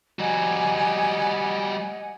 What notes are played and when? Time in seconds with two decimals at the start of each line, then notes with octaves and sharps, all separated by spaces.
0.19 G3 F#4 D#5 F#5 G#5